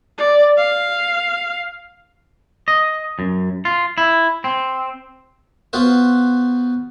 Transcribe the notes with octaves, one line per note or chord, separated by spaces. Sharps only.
D5
F5
D#5
F#2
F4
E4
C4
B3 F4 F#4 B4 C5